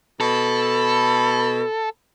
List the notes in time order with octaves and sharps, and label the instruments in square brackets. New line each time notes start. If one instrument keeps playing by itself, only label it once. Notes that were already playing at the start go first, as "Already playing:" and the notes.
[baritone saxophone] B2 [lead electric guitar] A4 [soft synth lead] B5